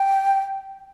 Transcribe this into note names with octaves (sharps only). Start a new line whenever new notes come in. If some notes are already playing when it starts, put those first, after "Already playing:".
Already playing: G5